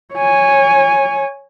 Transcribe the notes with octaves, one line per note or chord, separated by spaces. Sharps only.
C#5 G#5